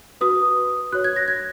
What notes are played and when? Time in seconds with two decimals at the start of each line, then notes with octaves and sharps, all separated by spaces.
0.21 F#4 B4 D#6
0.92 F#4 C#5 F#6
1.04 G#6
1.16 A#6
1.28 G#6